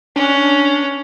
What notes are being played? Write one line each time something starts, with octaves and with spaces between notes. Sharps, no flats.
C#4 D4